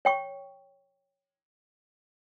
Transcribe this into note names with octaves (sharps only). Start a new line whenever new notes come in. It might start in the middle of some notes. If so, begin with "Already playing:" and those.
C#5 G5 C#6